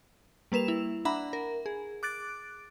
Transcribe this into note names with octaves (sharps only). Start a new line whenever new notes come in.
G3 A#3 B4 E7 F7
E4
D4 E5 F#5 A#5 B5
A#4
G#4
D6 F#6 A6 D7